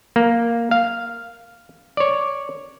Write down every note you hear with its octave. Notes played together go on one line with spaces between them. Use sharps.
A#3
F5
C#5 D5